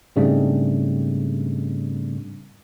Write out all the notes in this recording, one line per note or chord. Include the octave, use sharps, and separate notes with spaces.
G#2 C#3 G3 A3 C4 D4